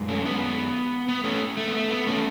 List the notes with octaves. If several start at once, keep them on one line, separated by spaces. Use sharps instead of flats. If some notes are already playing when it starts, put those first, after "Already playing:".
Already playing: F#2 G#3
A3 C#4
B3
B3
A3 C#4
A3
B3
A3
B3
A3 C#4